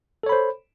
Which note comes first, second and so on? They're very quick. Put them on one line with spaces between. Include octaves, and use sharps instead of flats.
A4 C#5 B5 C5